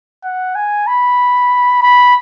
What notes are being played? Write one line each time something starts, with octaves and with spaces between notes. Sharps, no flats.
F#5
G#5
B5
B5